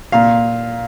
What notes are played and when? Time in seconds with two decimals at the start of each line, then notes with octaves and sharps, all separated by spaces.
0.12 A#2 F5